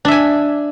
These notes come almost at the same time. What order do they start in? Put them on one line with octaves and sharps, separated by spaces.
D4 E5 G#5